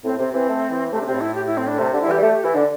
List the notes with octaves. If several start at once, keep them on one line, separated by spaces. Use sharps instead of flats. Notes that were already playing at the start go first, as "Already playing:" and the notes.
A2 C4
C3 C4
E3 C4
A3
E3
C3 A3
D4
C3 C4
A2
E4
G4
E4
C4
D4
C3 A3
D3 D4
G3 E4
E3 G4
G3
A3 G4
G4
E3 E4
D3 D4